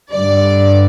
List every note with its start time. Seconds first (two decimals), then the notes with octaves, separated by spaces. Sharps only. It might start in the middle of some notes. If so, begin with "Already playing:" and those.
0.12 G2 D3 D5